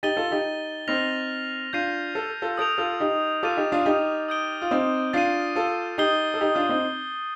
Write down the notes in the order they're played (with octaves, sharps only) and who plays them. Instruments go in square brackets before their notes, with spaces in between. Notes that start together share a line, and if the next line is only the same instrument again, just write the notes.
[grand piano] D#4 G4 [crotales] A6 D#7 G7
[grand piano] F4 A4
D#4 G4
[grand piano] C4 D#4 [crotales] F6 A#6 F7
[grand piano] D4 F4 [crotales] G6 C7 D#7
[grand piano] A4
F4 A4
[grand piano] A4 [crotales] D#6 G6 D7 F7
[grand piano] F4 A4
D#4 G4
[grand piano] F4 A4 [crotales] D6 F6 A6 D#7
[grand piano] D#4 G4
D4 F4
D#4 G4
[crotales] D#6 G6 D7 G7
[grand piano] F4
C4 D#4
[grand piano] D4 F4 [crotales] A6 C7 D#7
[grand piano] F4 A4
[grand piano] D#4 G4 [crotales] D#6 G6 C7 G7
[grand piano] A4
D#4 G4
D4 F4
C4 D#4